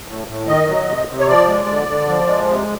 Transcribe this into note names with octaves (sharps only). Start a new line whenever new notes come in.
A2
A2
D#3 D#5
F#3
C3
C3
C#5
F3 D5
G#3
D3
D3
F3
G#3
C3